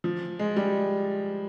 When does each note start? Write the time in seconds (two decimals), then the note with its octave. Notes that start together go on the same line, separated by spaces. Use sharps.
0.04 F3
0.39 G#3
0.57 G3